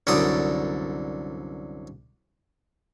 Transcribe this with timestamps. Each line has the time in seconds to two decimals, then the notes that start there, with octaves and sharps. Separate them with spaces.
0.07 C2 F#2 D3 D5 D#6